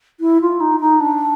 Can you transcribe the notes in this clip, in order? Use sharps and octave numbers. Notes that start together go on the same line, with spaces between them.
E4
F4
D#4
D#4
D4